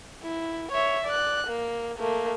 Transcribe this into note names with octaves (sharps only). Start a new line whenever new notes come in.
E4
C#5 E5
D5 F#6
A#3
A3 A#3